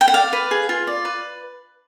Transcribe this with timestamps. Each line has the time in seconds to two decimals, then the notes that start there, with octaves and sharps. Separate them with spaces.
0.01 G5
0.08 F#5
0.14 D5 F5
0.33 B4
0.51 G#4
0.69 F4
0.87 D5
1.05 B4